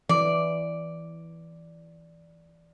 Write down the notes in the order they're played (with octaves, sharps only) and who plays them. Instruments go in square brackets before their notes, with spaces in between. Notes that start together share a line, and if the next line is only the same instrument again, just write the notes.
[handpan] E3 [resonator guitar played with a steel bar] D5